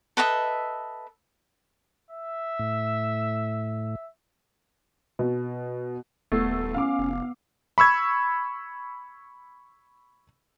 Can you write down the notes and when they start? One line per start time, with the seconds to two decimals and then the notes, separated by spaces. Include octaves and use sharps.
0.17 A4 B4 D#5 E5
2.10 E5
2.59 A2
5.19 B2
6.32 D#1 A3 B3 E6 C7
6.74 C#4 F5 D6
6.99 F1
7.78 B5 C#6 E6 G#6